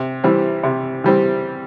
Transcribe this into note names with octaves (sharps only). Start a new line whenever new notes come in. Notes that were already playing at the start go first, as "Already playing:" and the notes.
Already playing: C3
E3 G3 C4
C3
E3 G3 C4